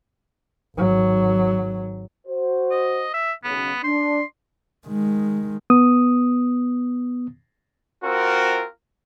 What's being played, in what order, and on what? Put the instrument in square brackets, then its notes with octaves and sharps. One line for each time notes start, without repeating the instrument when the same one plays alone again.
[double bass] G#1 F#3
[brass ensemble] F#4 C5
[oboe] D#5
E5
[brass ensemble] B1 C#3 [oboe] B3
[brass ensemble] D4 [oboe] C6
[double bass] D#3 G#3
[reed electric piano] B3 D#6
[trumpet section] C4 F4 F#4 A#4